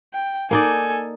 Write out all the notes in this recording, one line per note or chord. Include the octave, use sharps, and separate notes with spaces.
G5
A#3 D#4 A4 D5 G#5